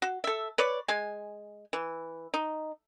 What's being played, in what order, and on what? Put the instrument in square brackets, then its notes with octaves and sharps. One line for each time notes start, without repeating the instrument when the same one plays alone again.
[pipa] F#4
A4 E5
B4 C#5 D5
G#3 G#5
E3
D#4